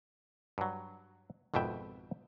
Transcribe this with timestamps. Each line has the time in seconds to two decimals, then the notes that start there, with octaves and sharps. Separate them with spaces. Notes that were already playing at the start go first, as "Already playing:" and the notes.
0.58 G2 F#3
1.54 G#1 F2 B2 E5 G5